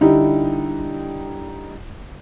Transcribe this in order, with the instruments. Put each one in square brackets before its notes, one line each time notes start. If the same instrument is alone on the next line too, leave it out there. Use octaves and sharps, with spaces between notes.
[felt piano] D3 G3 D#4 E4 G4